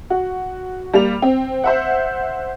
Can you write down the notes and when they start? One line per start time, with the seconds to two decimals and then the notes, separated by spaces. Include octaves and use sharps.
0.10 F#4
0.94 G3 A#3 F7
1.22 C4
1.64 C5 E5 F#5